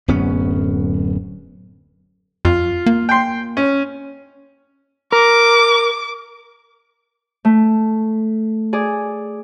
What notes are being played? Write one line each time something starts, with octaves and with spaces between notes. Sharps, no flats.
D1 F#2 B3 C#4
F2 F4
A#3
G5 C6
C#4
A#4 D6
A3
G#4 D5